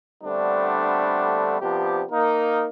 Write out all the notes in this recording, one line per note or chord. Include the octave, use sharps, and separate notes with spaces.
D3 G3 A3 B3 C4 D4
C3 F3 B3 D4 G4
A#3 D#4 A#4